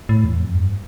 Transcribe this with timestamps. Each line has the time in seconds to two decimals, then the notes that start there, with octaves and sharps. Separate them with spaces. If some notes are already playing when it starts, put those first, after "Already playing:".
0.09 A2
0.24 E2
0.39 F2
0.54 G2